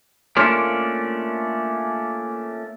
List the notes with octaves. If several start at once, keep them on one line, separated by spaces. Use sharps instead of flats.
A3 A#3 C#4 D4 F4 A#4